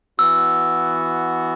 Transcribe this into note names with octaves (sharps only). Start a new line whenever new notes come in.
E3 B3 F#4 E6